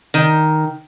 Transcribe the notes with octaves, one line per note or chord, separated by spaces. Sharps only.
D#3